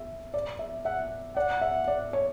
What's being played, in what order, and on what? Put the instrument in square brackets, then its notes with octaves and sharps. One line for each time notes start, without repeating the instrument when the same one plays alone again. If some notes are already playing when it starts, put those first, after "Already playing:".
Already playing: [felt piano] E5
D5
E5
[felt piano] E5 [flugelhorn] F#5
[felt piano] D5 [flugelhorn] F#5
[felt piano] E5
D5
C#5